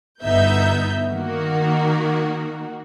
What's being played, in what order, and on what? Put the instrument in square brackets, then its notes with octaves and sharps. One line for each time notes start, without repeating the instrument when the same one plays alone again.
[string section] G1 B3 D#4 E5 G6
D#3 A#3 F#4